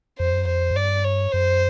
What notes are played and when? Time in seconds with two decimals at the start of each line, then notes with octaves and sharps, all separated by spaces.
0.19 F2 C5
0.32 F#2
0.46 F2 C5
0.71 F#2
0.76 G2 D5
1.05 C#5
1.33 F#2 C5